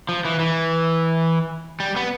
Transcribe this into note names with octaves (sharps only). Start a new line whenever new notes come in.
F3
E3
E3
G3
B3